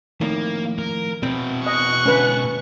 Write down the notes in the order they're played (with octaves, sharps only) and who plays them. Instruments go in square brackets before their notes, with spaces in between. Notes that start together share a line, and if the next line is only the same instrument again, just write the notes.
[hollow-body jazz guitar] F2 A2 D#3 [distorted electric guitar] A#3
[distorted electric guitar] A#4
[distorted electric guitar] B2 E4 [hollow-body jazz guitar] C4
[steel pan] D#5 [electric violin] C#6 F#6
[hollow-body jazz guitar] G#2 D3 [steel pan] C#4 B4